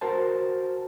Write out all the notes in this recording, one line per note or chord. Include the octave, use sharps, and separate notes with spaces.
F#4 A#4 C5 A5